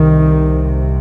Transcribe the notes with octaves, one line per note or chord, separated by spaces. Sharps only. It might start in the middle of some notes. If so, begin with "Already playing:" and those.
Already playing: C2 C3 D#3